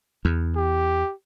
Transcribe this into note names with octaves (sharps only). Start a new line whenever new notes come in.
E2
G4